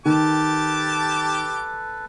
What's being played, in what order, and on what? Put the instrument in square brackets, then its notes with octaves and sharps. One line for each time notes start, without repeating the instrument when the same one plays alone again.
[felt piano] D#3 [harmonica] G4 A5 D6 [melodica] A4 B4